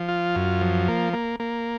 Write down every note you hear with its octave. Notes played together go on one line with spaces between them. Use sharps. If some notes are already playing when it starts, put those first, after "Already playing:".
Already playing: F3
F4
F#2
F3
A#3
A#3
A#3